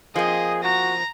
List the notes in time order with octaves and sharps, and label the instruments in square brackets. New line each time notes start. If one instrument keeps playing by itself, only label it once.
[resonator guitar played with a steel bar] F3 A#3 C4 [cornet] G#4 [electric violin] D#5
[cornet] F#4 [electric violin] A#5 A#6